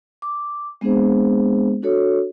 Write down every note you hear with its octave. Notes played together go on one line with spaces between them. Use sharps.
D6
G#3 B3 C4 D4 G#4 C5
D4 F#4 A4 C#5